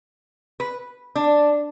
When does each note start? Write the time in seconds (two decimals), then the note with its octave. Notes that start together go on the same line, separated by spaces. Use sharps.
0.60 B4
1.15 D4